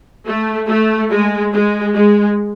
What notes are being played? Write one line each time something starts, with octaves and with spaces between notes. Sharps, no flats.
A3
A3
G#3
G#3
G#3